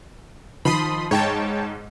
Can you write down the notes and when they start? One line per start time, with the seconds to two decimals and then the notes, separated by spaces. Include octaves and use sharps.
0.65 D#3 F3 B5 C6 D#6
1.11 G#2 C#5 G5 A5